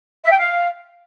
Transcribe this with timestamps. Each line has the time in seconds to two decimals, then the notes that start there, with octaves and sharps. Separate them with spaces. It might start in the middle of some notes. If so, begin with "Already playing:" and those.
0.24 E5
0.31 G5
0.38 F5